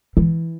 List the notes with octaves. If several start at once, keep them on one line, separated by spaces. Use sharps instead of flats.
E3